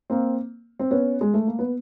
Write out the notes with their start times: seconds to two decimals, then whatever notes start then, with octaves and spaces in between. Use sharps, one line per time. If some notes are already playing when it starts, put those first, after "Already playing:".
0.10 A#3 C4
0.79 C4
0.91 B3 C#4
1.21 G#3
1.34 A3
1.47 A#3
1.59 B3